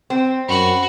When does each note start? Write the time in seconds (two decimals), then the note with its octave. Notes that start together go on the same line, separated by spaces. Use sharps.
0.10 C4
0.49 F#2 F#4 B5